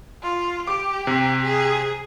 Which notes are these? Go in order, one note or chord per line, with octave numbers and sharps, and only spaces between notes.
F4
G4 D6
C3
G#4